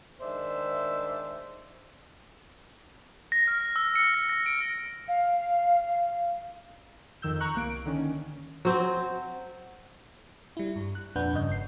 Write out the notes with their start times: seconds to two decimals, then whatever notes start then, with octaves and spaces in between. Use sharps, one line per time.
0.21 D#3 G#3 D4 C5 E5
3.32 A#6
3.48 F6
3.61 A#6
3.76 E6
3.96 C#7
4.14 A#6
4.29 A#6
4.46 D7
5.08 F5
7.22 F2 D#3 E6 G6
7.40 A#5 C#6 F#6
7.55 C2 A#3 D7
7.85 D3 D#3 C#4
8.65 F#3 C4
10.57 G3 E4
10.76 G2
10.95 F#6
11.16 F2 A#2 D4 B4 F#5 G6
11.33 G2 C#3 D#5 G6
11.51 G1 C7